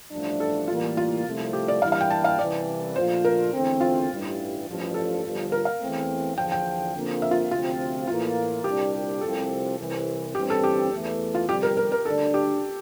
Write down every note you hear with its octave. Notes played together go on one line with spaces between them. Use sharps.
A1 G2 F3 A3 D4
A4
A2 E3 G3 A#3 F4
F4
C2 C3 F3 A3
G4
D5
G2 E3 G3 A#3 E4 F5
F5
G5
A5
F5
C2 C3 E3 D5
A#2 F3 A3 D4 F4 C5
A#4
E2 D3 A3 C4
F4
A1 G2 E3 G3
A1 G2 F3
A4
G1 G2 F3
A#4
F5
E2 E3 A3 C4
E2 D3 F3 G5
G5
F2 D3 F3 A#3
E5
F4
D2 C3 F3 C4 F4
A2 E3 A#3 F4
C2 A#2 G3 D4 G4
C2 C3 F3 C4 A4
C2 C3 E3
A1 G2 E3 G3 C4 G4
A4
G4
E2 E3 A3
F4
G1 F2 C3 G3 G4
A#4
A#4
A#4
D2 D3 G3 D4 A4
G4